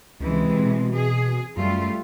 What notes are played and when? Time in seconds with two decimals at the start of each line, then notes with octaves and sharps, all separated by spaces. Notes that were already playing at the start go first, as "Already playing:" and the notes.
0.20 C#2 C3 E3 G#3
0.59 B2
0.95 G#4
1.57 F#2 G3 A3 F4